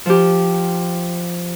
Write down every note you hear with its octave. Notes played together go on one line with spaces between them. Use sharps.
F3 G4